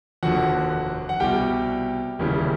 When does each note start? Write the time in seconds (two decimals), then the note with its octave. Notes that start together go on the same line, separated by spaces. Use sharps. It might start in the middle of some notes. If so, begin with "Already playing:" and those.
0.23 F1 D#2 D3 F3 F#4 F#5
1.09 F#5
1.20 C2 B2 G3 G4 G5
2.19 F1 D#2 C#3 E3 G3